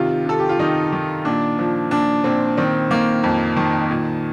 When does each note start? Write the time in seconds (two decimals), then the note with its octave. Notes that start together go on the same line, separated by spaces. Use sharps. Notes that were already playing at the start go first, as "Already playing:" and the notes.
Already playing: C3 D#3 F4
0.26 C3 A4
0.39 G4
0.49 F4
0.59 D#3 D#4
0.92 D#3
1.25 A#2 D4
1.59 F3
1.91 A#2 D4
2.24 A#2 C4
2.58 D#3 C4
2.91 D#3 A#3
3.24 F2
3.57 D#3
3.90 A#2